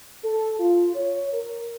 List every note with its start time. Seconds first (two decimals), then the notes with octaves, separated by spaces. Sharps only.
0.24 A4
0.59 F4
0.95 C#5
1.32 A#4